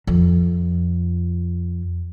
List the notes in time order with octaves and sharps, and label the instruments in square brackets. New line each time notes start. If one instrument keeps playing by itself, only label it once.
[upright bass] F2